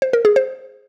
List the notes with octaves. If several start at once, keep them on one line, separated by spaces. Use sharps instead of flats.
C5
A#4
G#4
C5